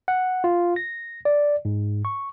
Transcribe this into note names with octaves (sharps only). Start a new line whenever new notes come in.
F#5
F4
A#6
D5
G#2
C#6